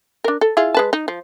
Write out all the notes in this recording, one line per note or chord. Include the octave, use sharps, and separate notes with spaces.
D4 A#4
A4
E4 F4 G#4
G#3 B4 A5
D#4
F3